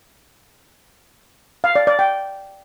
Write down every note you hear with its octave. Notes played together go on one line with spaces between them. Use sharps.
F5
D5
D5
G5